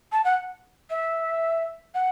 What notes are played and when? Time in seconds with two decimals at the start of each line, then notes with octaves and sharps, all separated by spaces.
0.12 A5
0.24 F#5
0.89 E5
1.94 F#5